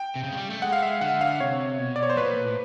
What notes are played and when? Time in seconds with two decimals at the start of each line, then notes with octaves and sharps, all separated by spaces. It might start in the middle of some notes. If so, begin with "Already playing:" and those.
Already playing: G5
0.16 C3
0.24 C#3
0.32 G#3
0.37 G3
0.50 A3
0.62 G#3 F#5
0.73 F5
0.82 E5
1.01 D3 F#5
1.21 F5
1.40 C3 C#5
1.78 B2
1.96 D5
2.03 C#5
2.10 C5
2.17 A#2 B4
2.44 A2